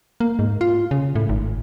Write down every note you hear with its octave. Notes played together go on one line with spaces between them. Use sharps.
A#3
G#2
F4
C#3
A2
G#1